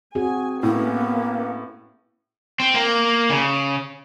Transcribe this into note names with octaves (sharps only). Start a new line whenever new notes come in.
C4 F#4 G#4 G#5
A2 A#3 B3 C#4
C4
A#3
C#3